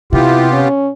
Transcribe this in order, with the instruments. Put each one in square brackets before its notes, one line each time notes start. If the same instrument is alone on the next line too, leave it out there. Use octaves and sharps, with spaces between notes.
[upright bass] C3 [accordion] B3 F4 G4 [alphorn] E4
[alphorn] C#4